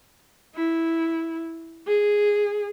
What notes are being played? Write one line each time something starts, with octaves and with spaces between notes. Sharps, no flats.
E4
G#4